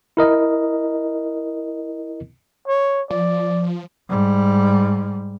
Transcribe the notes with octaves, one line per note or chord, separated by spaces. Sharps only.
E4 A#4 D#5
C#5
F3 D5
G#2 G3